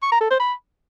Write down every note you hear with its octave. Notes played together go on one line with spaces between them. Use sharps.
C#6
A#5
A4
C5
B5